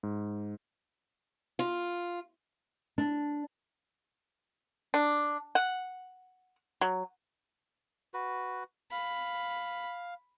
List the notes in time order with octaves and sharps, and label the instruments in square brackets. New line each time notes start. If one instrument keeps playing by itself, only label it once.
[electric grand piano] G#2
[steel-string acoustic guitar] F4
[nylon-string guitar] D4
[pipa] D4
F#5
F#3
[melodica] F#4 B4
[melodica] F5 [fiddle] B5